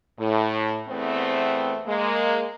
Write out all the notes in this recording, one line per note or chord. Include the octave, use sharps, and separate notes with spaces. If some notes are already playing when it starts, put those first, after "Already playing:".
A2
E2 A3 B3 C4
G#3 A#3